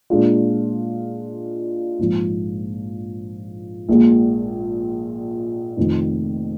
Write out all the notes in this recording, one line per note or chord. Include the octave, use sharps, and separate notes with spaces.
A#2 G#3 D4 F4
A#1 G#2 F3
A#1 A#2 G#3
F1 F2 D#3